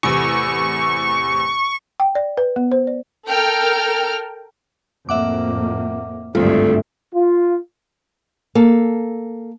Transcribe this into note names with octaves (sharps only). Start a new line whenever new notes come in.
E2 A2 C3 C#6
G5
D5
B4
B3
C5
D5
A4 A#4 G5 F6
F2 A2 A#3 E5 F#5 D6
G#1 D2 G2 A3 C4 F4
F4
A#3 A4